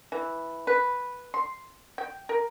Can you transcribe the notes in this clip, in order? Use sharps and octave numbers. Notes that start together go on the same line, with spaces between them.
E3
B4
C6
G5
A#4